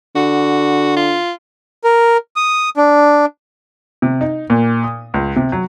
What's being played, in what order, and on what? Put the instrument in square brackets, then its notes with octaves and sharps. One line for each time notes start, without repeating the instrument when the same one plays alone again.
[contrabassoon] D3 [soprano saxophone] F#4
[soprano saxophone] F4
[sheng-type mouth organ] A#4
D#6
D4
[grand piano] C3
D#4
A#2
D#6
C#2
C3
F#3